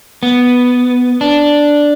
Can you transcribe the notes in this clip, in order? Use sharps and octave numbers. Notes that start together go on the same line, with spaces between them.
B3
D4